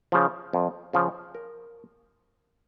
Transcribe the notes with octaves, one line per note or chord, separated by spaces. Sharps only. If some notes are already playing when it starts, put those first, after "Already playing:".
C#3 F3
F2
C#3 F3
A#4